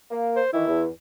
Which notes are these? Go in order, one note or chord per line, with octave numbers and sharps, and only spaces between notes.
A#3
C5
D#3 E3 E4
E2